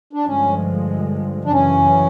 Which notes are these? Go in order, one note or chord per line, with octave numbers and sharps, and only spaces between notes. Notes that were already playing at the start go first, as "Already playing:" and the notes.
D4
G2 D3 F3 G#3 C#4
D4
F#2 C#3 E3 C#4